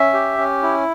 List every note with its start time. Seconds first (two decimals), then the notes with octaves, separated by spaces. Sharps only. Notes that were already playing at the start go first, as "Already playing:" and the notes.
Already playing: C#4 E5
0.13 G4
0.38 C#4
0.63 E4